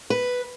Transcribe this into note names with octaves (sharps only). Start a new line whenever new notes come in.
B4